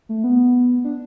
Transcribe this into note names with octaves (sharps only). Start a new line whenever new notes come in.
A3
B3
D4